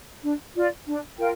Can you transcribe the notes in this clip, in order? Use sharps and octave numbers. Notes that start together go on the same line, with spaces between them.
D4
F4 D5
D4
F4 A#4 G5